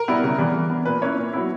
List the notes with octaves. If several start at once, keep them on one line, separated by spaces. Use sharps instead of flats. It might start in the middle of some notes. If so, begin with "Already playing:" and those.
Already playing: A#4
G3 B3 E4
C#3
E3 G3 B3
E3
B3 D4
A#2 B4
A#3 C#4 E4 C#5
A#2
F#3 B3 E4